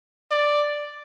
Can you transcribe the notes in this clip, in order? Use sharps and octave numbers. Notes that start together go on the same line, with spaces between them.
D5